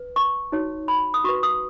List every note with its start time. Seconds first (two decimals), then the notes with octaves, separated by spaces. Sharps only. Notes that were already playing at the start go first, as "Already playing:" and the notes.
Already playing: B4
0.16 C#6
0.52 D#4 F#4 C#5
0.88 B5
1.14 D#6
1.24 F#4 B4 C#6
1.43 D#6